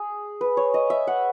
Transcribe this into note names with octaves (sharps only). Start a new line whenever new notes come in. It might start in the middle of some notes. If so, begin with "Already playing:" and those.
Already playing: G#4
B4
C#5
D#5
E5
F#5